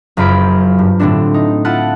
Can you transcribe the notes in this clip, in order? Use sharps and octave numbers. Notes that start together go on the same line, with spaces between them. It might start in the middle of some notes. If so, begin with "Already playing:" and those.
F#1 F#2 F4 C5 B5 D7
G2
A2 D3 A3 C4 D4
D#4
E4 F4 F#5 A5